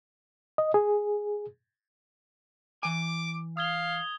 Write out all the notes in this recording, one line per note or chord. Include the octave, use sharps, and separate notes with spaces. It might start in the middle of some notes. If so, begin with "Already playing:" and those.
D#5
G#4
E3 G#5 D6
F5 D#6 G#6 G7